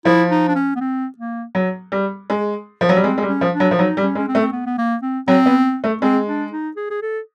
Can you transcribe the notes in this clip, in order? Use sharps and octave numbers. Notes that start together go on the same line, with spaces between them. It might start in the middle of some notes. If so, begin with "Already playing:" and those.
F3 E4
D#4
D4
C#4
B3
C4
A#3
F#3
G3
G#3
F3
F#3
G3
G#3 C4
G#3
G3
C#4
F3
D4
F#3
F3
F#3 D#4
G3
C#4
G#3
C#4
C4
A3
C4
B3
B3
A#3
C4
F#3 C4
B3
A3
G#3 C4
D4
D#4
G#4
G#4
A4